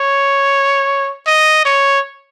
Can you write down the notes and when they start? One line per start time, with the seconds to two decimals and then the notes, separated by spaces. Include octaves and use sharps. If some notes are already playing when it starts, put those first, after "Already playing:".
Already playing: C#5
1.27 D#5
1.65 C#5